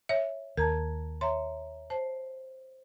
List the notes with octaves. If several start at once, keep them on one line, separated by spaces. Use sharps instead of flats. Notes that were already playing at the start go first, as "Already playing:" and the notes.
C#5 E5
D#2 A#4 A5 A#5 G#6
C#5 E5 A#5 C6
C5 A5